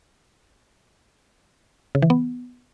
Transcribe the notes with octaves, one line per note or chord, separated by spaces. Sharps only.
C#3
E3
B3